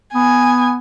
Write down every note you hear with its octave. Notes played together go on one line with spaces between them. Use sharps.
B3 G#5